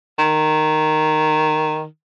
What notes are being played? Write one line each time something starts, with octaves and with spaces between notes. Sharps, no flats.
D#3